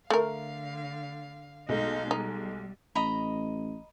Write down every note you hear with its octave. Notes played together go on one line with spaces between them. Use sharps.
D3 A3 A#4 F5
B1 G#3 A3 D#4 F5 G6
G3 D#4
A1 D#5 A#5 B5